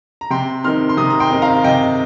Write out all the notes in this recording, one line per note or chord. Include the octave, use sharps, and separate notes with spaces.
A#5
C3 G5 C6
D#3 C4 D#4 C6 F6
C6
C3 A#5 D#6
A#5
G5 C6
D#3 C4 D#4
F5 A#5
C3 D#5 G5